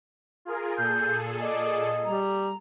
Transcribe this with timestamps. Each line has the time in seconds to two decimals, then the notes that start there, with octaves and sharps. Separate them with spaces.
0.45 F4 G#4 A#4
0.78 A#2 G#4 A4 G6
1.42 D5 D#5
2.05 G3 A#5